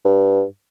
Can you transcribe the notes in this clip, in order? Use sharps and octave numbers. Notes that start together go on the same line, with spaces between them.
G2